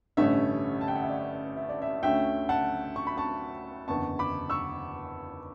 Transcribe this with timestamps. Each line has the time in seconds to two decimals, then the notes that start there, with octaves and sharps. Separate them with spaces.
0.17 A1 G2 D3 A3 C#4 E5
0.81 A5
0.88 G5
0.95 F#5
1.03 E5
1.10 D5
1.57 E5
1.69 D5
1.82 E5
2.03 D2 D3 A3 C#4 E5 G5
2.49 F#5 A5
2.96 C#6
3.07 B5
3.17 A5 C#6
3.88 F#1 E2 D3 A5 C#6
4.19 B5 D6
4.50 C#6 E6